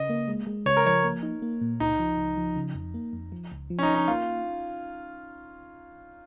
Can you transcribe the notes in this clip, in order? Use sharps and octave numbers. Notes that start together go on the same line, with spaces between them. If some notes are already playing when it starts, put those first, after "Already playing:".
Already playing: C#3 D#5
A#3
G#3
G#3
C#3 C#5
A#4
F3 C#5
A#3
D#4
A#3
A#2
C#2 D#4
F3
C#2
F3
C#3
F2
A#3
F2
F3
C#2
F3
C#4
D#4
F3
D#4
A#3 F4